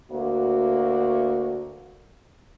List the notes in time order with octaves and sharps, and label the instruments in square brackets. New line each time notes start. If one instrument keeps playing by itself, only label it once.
[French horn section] D2 A#3 F#4